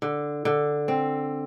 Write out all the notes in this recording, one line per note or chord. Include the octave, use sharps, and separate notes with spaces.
D3
D3
C4